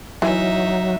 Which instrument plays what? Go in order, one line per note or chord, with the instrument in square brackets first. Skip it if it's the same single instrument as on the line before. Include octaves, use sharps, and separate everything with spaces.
[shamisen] E3 [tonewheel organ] F#3 [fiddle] D#4 E5